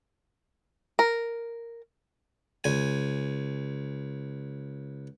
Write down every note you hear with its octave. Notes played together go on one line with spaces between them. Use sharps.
A#4
C#2 G#5